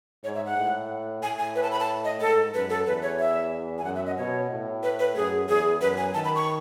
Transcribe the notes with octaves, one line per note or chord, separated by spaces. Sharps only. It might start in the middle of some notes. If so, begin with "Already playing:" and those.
G#2 C#5
E5
F#5
A2
A2 G#5
G#5
B4
A5
B5
A5
D#5
G#2 A4
F#2 B4
A4
E2 B4
C#5
E5
G#5
F#2 F#5
E5
D#5
B2 C#5
A2
B4
B4
F#2 G#4
E2 G#4
F#2 B4
G#5
D#3 A5
B5
C#6